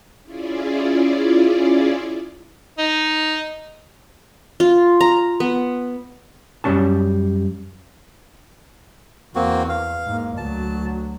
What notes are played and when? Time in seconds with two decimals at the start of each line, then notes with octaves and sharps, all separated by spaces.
0.23 C#4 E4 F4 G#4 D5
2.78 D#4
4.60 F4
5.01 A#5
5.40 B3
6.64 F#2 G3 G#3 C#4 A5
9.35 E2 A#3 C4 F#4
9.69 F5
10.06 G#2 A#3
10.37 D2 F#3 A5